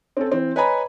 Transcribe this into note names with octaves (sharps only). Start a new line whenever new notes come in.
C4 C#4 A4
E3 C4
B4 C#5 D#5 G#5 A#5 B5